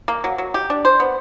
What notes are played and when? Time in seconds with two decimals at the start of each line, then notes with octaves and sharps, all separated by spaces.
0.08 A#3
0.24 F#3
0.38 F#3
0.54 G4
0.70 D4
0.85 C5
1.00 B3